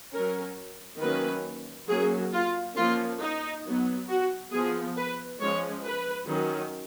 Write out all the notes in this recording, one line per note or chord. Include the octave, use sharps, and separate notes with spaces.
F#3 C#4 A#4
D#3 F#3 A#3 C#4 B4
F#3 A#3 C#4 G#4
F4
F3 A#3 C#4 F4
D#4
F#3 B3
F#4
F3 B3 G#4
B4
F3 G#3 C#4 C#5
B4
D#3 F#3 C#4